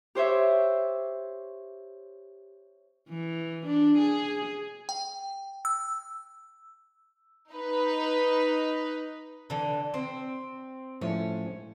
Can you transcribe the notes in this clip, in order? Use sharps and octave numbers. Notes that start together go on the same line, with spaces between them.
G4 C5 C#5 E5
E3
D4
G#4
G5
E6
D#4 B4
D3 E3
C4
A2 F3 A3 C#4